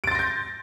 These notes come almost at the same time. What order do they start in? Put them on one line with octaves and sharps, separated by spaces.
D7 A6 C6 A#6 G6